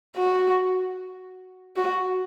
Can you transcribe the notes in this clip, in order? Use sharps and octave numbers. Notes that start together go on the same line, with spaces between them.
F#4
F#4